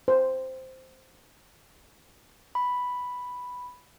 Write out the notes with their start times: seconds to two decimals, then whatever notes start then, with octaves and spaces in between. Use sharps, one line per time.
0.08 C5
2.55 B5